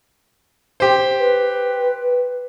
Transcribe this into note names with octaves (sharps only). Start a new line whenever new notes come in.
G4 C5
B4